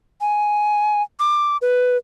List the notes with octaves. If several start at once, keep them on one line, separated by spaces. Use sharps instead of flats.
G#5
D6
B4